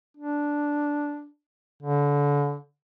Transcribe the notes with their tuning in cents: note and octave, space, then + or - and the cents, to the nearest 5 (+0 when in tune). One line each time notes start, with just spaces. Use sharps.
D4 -5
D3 -30